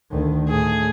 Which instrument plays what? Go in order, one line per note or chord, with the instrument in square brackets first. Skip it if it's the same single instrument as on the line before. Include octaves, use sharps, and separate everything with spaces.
[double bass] D2 D#3
[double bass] A2 A3 [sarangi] G#4